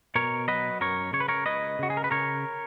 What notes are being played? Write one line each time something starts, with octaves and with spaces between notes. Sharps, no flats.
B2 A#4 C#5
F#3 B4 D#5
F#2 A#4 C#5
C#3 C#5
B4
A#4 C#5
C#2 B4 D#5
C#3 F#4
G#4
A#4
B4
C#3 A#4 C#5